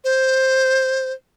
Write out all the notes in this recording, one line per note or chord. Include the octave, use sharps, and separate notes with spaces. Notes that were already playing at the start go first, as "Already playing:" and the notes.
C5